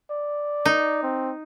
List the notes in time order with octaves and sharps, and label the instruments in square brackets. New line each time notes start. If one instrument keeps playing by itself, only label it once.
[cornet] D5
[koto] D#4
[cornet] C4